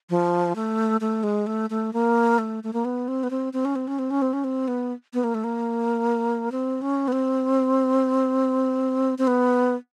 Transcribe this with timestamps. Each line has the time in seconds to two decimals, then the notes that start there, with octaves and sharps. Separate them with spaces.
0.10 F3
0.56 A3
1.01 A3
1.23 G#3
1.47 A3
1.70 A3
1.93 A#3
2.38 A3
2.64 A3
2.73 A#3
2.85 B3
3.08 C4
3.23 B3
3.30 C4
3.53 C4
3.65 C#4
3.76 C4
3.87 C#4
3.99 C4
4.11 C#4
4.22 C4
4.33 C#4
4.44 C4
4.68 B3
5.14 B3
5.24 A#3
5.35 A3
5.44 A#3
6.52 C4
6.82 C#4
7.08 B3
7.12 C4
9.18 C4
9.27 B3